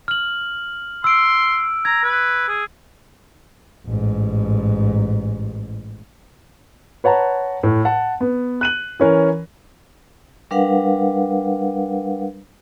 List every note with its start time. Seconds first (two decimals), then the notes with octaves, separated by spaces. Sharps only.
0.08 F6 F#7
1.04 C6 E6 D7
1.85 A#5 G#6
2.04 B4
2.48 G#4
3.87 A1 G#2
7.04 B4 C#5 F#5 A5 A#5
7.63 A2
7.85 F#5 A5
8.21 B3
8.61 F#6 D#7 F#7
9.00 E3 C#4 A#4
10.51 G3 D4 A#4 B4 F5 F#5